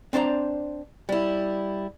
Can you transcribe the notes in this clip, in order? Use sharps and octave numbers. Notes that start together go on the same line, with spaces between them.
C4 D4 C5 D5 A#5
G3 E4